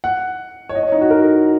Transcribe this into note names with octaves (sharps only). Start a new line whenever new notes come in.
F#5
C#5
D#5
C#5
D#4
F#4
A#4